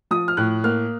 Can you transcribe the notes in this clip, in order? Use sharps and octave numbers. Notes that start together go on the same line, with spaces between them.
F3 D#6
F6
A2 F#6
A#3 F6